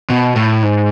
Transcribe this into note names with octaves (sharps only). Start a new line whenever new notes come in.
B2
A2
G#2